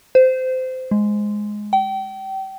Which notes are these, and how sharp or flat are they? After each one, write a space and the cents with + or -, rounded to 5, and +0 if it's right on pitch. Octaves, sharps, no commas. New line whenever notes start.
C5 -20
G#3 +5
G5 -30